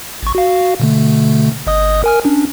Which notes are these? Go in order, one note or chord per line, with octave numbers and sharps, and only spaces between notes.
A1 C#6
F#4 F5
B2 D3 A3
G1 D#5 D#6
A#4 G#5 F6
C#4 D4